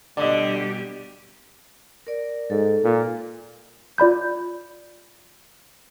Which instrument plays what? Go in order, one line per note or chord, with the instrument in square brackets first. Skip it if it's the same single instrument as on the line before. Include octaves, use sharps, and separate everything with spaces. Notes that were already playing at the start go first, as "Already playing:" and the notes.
[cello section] B2 G3 G4 [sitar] D3 [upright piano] D5 D#5
[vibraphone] A#4 D5
[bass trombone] G#2 [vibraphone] A4
[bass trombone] A#2
[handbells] F4 D5 B5 G6